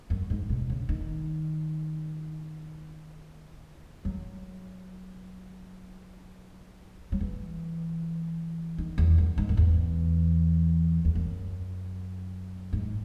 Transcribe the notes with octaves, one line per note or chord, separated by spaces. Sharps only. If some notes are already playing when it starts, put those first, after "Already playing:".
F#2
G#2
B2
C#3
D#3
F#3
F#3
E3
D#3
E2
F#2
G#2
F#2
E2
E2
F#2
G#2